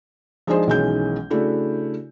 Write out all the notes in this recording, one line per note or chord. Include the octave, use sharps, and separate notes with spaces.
F3 G#3 D4 D#4 G#4 C5
B1 D#3 E3 G#3 C#4 G6
C#3 A3 D4 E4 F#4